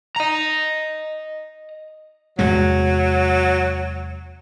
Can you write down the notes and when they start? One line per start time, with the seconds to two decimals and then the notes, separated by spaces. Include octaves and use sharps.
0.16 D#5 A#5
2.39 E2 C3 F#3 G#3